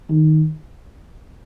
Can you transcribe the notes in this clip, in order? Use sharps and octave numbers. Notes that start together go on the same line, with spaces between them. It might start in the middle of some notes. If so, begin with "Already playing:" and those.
D#3